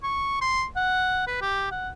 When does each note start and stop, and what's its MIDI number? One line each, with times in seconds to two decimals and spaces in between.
0.03 0.40 85
0.41 0.64 84
0.76 1.24 78
1.27 1.41 71
1.41 1.67 67
1.72 1.89 78